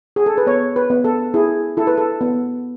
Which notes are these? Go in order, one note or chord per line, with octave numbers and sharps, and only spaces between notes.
G#4
A4
B4
B3 C#5
B4
B3
A4
E4 G#4
E4 A4
B4
A4
B3